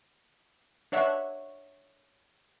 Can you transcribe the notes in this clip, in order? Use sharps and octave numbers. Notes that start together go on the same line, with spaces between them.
D4 C#5 E5 F#5